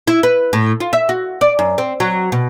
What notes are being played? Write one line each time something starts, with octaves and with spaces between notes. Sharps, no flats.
E4
B4
A2
F4
E5
F#4
D5
F#2
C4
F#3
B2